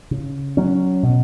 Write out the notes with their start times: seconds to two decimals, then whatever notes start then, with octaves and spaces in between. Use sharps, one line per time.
0.11 C#3
0.57 F#3 C#4
1.03 B2